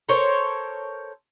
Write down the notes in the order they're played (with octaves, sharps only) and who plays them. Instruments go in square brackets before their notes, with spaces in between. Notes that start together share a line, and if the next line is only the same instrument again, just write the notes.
[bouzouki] A4 A#4 C5 C#5